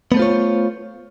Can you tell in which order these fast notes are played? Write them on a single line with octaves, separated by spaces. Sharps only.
B3 A3 C5 F4 C#5